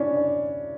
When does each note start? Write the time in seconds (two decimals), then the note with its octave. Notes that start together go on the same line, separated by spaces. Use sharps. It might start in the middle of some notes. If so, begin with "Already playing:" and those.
Already playing: C#4 D4 E4
0.16 D4